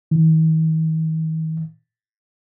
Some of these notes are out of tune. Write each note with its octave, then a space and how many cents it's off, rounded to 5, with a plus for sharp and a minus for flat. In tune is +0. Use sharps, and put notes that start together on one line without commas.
D#3 +45